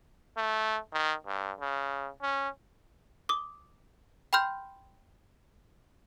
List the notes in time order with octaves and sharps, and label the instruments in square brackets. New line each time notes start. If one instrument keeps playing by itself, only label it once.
[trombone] A3
D#3
G2
C#3
C#4
[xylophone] D6 D#6
G5 B5 C6 F6 G6